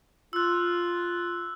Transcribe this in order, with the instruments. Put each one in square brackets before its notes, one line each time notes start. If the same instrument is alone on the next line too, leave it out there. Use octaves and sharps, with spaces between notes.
[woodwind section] F4 [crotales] E6 F#6